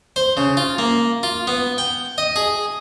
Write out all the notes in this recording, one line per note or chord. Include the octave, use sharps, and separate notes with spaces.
C5
C#3
F4
A#3
F4
B3
G5
D#5
G#4